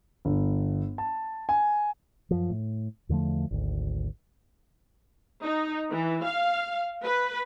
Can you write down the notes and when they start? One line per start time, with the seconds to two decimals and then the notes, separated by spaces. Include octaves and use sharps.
0.25 G1
0.98 A5
1.49 G#5
2.31 F#2 F3
2.50 A2
3.09 E2 D3 F3 A3
3.51 G#1 D2
5.43 D#4
5.92 E3
6.26 F5
7.05 B4